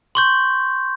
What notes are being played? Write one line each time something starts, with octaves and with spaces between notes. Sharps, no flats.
C6 C#6 G6